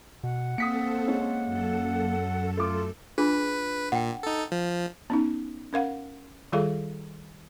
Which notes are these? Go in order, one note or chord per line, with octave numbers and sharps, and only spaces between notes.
B2 F#5
A#3 C4 A4 D#6 B6 C#7
G#3 C#4
F#2 A4
A3 F4 D6
D4 F4 G#4 B4
A#2 F#5 G5
D#4 A4
F3
B3 C#4 D#4
C#4 A#4 F5 F#5
D#3 G3 F4 G#4 A4 F5